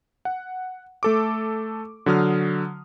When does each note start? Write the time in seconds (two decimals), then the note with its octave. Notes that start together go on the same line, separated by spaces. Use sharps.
0.25 F#5
1.03 A3 A4 D6
2.06 D3 F#3 D#6 F6